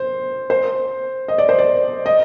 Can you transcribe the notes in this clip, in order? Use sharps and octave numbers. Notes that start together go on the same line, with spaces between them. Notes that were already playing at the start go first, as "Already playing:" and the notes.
Already playing: C5
C5
D#5
D5
C5
D5
D#5